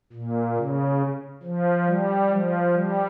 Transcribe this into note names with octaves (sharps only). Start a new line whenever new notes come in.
A#2
C#3
F3
G3
F3
G3